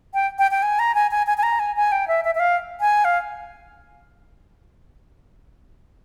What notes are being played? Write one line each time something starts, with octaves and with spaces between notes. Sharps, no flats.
G5
G5
G5
G#5
A#5
G#5
G#5
G#5
G#5
A#5
G#5
G#5
G5
E5
E5
E5
F5
G#5
F5